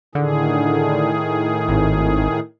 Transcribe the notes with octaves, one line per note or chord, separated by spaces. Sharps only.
A2 D3 D#3 G#4
G#1